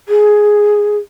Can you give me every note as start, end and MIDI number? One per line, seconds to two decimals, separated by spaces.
0.09 0.97 68